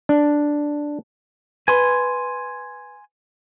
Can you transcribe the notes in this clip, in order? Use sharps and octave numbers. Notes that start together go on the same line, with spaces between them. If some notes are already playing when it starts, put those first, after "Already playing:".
D4
B4 G#5 C6